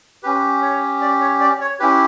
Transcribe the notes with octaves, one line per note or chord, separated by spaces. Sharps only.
C#4 G4 B4
C#5
D5
C#5
D5
C#5
C#4 E4 G4 B4